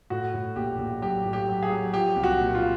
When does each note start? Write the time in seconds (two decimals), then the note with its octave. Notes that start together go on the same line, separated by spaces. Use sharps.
0.10 A2 F#4
0.34 A2
0.56 A#1 G4
0.79 A#1
1.02 F#3 G4
1.25 A2
1.33 G4
1.48 F#3
1.63 G#4
1.70 F#3
1.94 F3 G4
2.16 C2
2.24 F#4
2.40 A#2
2.55 F4